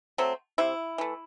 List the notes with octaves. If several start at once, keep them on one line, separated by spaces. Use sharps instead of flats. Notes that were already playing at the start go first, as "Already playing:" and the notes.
F#3 A3 C4
C3 E4
E3 A3